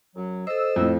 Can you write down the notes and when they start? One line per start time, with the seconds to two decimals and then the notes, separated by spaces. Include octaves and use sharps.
0.16 F#2 F#3
0.47 A4 C5 D#5 E6
0.76 F2 A2